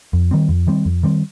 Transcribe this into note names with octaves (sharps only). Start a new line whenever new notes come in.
F2
D#3 G3 C4
F2
D#3 G3 C4
F2
D#3 G3 C4